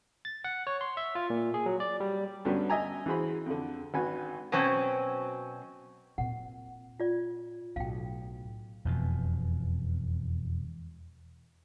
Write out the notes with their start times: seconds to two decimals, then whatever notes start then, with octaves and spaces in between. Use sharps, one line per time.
0.25 A6
0.44 F#5
0.67 C#5
0.81 C6
0.97 E5
1.15 F4
1.30 A#2
1.54 G#4
1.66 F#3
1.80 D5
2.00 G3
2.45 G2 D3 F#3 G3 B3 C#4
2.70 D#5 E5 G#5 A#5
3.06 E3 F#4 G#4 C5 B5
3.46 F2 D3
3.94 G#1 F#4 B4 G#5
4.52 B2 F#3 C4 C#4
6.18 A#2 C4 F#5
7.00 F4 D5
7.76 B1 A2 F5 G5
8.85 E1 F2 B2